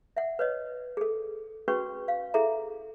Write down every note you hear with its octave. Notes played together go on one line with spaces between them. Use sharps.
E5 F#5
B4 C#5 D#5
G#4 A4
C#4 F#4 G#4 B4 G5 C#6
F5
E4 G#4 A4 E5 A#5